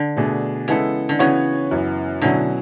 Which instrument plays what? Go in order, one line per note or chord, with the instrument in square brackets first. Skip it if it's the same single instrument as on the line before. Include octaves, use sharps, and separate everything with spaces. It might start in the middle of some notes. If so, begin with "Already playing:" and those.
Already playing: [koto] D3
[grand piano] B2 A3 D4 G#4
[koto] C#3 [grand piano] E3 G#3 B3 E4 A4
[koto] D3
[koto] C#3 [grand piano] E3 B3 F#4 C#5
[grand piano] F#2 E3 B3
[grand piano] B2 F#3 C#4 E4 [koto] D3